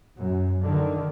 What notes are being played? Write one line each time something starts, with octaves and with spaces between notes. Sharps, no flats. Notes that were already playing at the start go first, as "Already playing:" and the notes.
F#2
D3 D#3